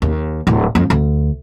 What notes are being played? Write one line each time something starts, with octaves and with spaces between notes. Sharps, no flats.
D#2
D1
F2
D2